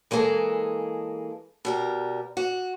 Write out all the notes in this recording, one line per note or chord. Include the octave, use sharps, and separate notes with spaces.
E3 G#3 A#3 B3 G#4 A4
B2 G3 A#4
F#4